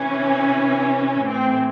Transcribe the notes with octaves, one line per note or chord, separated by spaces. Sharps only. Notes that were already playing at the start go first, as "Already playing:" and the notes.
Already playing: C3 E3 C#4
A2 E3 C4